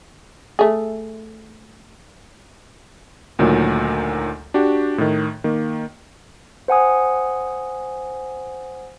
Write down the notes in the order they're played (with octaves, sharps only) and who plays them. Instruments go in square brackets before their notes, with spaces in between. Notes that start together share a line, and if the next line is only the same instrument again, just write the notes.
[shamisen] A3 G#4
[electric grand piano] D2 A#2 D#3 F#3
D4 F#4 G4
A2 D#3
D#3 A#3
[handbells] C5 F#5 G#5 D#6